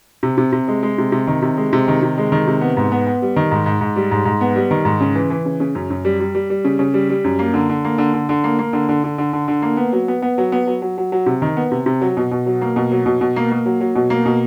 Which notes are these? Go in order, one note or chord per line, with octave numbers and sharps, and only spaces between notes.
C3
C3
C3
G#3
G#3
C3
C3
D#3
C3
G#3
C3
D#3
C3
G#3
D#3
C3
B3
G#2
B3
B3
G3
D#3
G#2
G#2
G#2
G3
G#2
G#2
B3
G3
D#3
G#2
C#3
E3
E3
C#3
C#3
F#2
F#2
G3
G3
G3
G3
C#3
C#3
G3
G3
F#2
A#3
D3
D3
A#3
D3
D3
D3
A#3
A#3
D3
D3
D3
D3
D3
D3
A#3
B3
F#3
B3
B3
F#3
B3
F#3
F#3
F#3
F#3
C3
D#3
B3
C3
C3
F#3
B2
B2
F#3
A#3
B2
F#3
B2
B2
A#3
A#3
F#3
F#3
B2
A#3
B2